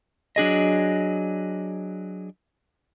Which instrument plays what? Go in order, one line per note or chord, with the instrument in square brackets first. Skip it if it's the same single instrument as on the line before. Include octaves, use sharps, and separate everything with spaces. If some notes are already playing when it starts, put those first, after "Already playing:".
[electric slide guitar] F#3 D4 G#4 D#5